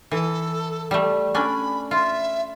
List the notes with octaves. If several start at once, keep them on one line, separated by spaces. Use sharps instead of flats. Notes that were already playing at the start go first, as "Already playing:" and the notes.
E3 A4
G3 A3
C#4 D4 D5 B5
F4 E5